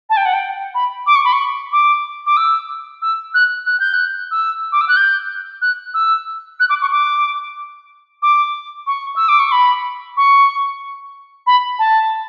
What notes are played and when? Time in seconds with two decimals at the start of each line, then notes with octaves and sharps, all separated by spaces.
0.10 A5
0.17 G5
0.26 F#5
0.34 G5
0.75 B5
1.07 D6
1.16 C#6
1.25 B5
1.33 C#6
1.72 D6
2.26 D6
2.37 E6
3.02 E6
3.34 F#6
3.66 F#6
3.80 G6
3.94 F#6
4.31 E6
4.72 D6
4.81 E6
4.88 F#6
4.97 G6
5.62 F#6
5.94 E6
6.60 F#6
6.70 D6
6.82 C#6
6.92 D6
8.22 D6
8.87 C#6
9.16 E6
9.29 D6
9.40 C#6
9.52 B5
10.17 C#6
11.47 B5
11.79 A5